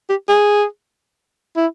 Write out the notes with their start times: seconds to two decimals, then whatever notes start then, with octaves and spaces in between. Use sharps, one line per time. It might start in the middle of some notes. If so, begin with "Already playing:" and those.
0.09 G4
0.29 G#4
1.57 E4